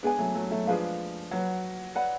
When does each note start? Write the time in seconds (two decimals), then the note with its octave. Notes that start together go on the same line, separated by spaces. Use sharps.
0.03 G#3 B3 D4 G#4 D5 G#5
0.18 F#3 A3
0.35 F#3 A3
0.51 F#3 A3
0.67 F3 G#3 D4 G#4 B4 F5
1.31 F#3 F#4 B4 F#5
1.95 B4 D5 F#5 B5